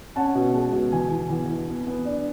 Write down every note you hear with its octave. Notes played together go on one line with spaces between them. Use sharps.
C#4 F#5 A5
B2
G#3
B2
E2 G#5
E3
E2
E3
B3
B3
D4